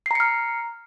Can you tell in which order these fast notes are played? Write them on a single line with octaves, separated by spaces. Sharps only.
C7 A#5 C#7 F6